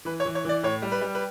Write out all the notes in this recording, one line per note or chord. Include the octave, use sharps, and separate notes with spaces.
E3 B4
C#5
E3
C#5
E3 D5
A2 C#5
G3
B4
G3
B4